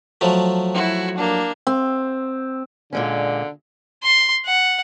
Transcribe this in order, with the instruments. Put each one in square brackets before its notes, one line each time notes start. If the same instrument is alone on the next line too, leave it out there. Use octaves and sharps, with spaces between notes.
[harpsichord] F3 F#3 A3
[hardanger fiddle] E4 F#4
A#3 D4
[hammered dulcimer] C4
[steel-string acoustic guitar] A#2 G#3 C#4 [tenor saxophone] D3
[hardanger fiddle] C6
F#5